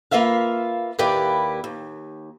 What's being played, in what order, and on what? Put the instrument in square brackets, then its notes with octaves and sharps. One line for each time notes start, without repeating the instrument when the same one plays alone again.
[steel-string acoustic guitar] A#3 F4 B4 E5 F5
D#2 A#3 E4 G4 B4 D5
D#2